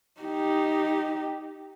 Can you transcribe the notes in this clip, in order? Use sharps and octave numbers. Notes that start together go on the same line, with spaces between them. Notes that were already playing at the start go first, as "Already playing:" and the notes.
D#4 G4